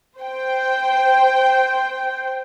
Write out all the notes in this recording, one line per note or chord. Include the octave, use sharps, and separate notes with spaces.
C5 G5